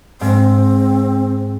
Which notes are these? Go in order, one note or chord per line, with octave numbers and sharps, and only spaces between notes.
G#2 C4